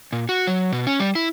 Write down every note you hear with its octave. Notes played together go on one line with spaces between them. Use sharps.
A#2
F#4
F#3
B2
C#4
G3
E4